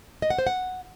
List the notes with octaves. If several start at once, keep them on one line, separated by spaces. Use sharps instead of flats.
D#5
F#5
C5
F#5